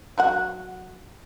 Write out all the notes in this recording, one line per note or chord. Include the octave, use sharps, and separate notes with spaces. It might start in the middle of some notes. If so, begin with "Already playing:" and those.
F#3 F#4 F#5